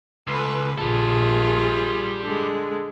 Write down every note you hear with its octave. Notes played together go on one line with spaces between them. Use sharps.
C#2 A4 B4
A#1 G3 F4 G#4 A4
D3 G#3